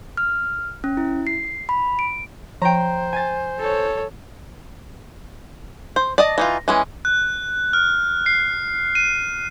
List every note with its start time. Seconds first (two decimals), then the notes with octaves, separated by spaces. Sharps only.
0.17 F6
0.84 C#4
0.97 E4
1.27 C7
1.69 B5
1.99 D7
2.62 F3 C5 G5 A#5
3.13 G#5 A6
3.60 A4 C#5
5.96 C5
6.18 D5 D#5 A5
6.38 E3 D#4 F4
6.68 E3 G#3 C#4
7.05 F#6
7.73 F6
8.26 C7
8.95 D#7